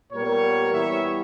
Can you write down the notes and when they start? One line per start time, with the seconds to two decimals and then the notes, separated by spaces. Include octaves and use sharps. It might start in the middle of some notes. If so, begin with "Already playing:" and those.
0.12 A#2 G3 B3 A#4 C#5
0.72 E3 G3 B3 C#5 E5